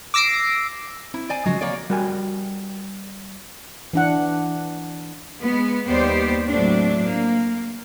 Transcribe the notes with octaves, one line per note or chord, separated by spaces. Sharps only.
D6 E6 A#6 C7 D7
C4 E4
C5 D5 G#5
C#3 F3 F#3 G#3 F#4
A#3 C4 C#5 D5
G3 F#4 A#4 G5 G#5
E3 D4 F#5
G#3 B3
D#2 G3 B3 G4 C5 D5
A2 F#3 A3 C4 D4
A#3